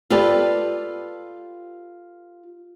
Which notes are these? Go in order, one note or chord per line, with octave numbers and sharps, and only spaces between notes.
F4 G4 A4 B4 D5